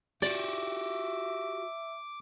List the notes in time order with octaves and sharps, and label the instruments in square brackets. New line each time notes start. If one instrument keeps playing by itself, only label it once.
[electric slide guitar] F#4 G4 [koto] D5 [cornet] E5 [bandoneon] D6